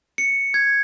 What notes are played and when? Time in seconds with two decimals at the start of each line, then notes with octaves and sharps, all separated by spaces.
0.18 C#7
0.54 G#6